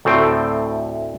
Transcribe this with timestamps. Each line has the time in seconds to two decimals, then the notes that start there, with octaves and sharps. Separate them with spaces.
0.05 D2 A2 A3 C4 G5